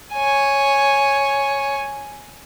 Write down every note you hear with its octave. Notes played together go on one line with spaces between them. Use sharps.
C#5 G#5